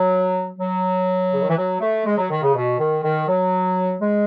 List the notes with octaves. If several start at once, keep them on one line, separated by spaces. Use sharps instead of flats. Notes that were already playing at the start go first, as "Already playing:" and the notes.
Already playing: F#3
F#3
C#3
D#3
E3
F#3
A3
G#3
F#3
D#3
C#3
B2
D#3
D#3
F#3
G#3